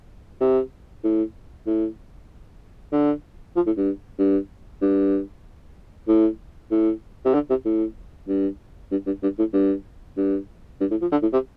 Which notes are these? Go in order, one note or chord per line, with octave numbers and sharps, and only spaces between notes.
C3
A2
A2
D3
F3
A2
G2
G2
G2
A2
A2
C3
D3
C3
A2
G2
G2
G2
G2
A2
G2
G2
G2
A2
F3
D3
A2
C3